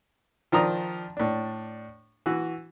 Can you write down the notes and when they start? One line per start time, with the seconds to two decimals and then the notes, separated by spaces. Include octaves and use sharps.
0.52 D#3 F3 D4 A#5 D#6
1.17 A2 D4
2.26 E3 F#4